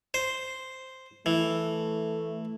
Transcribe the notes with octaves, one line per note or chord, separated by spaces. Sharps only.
C5
E3 A3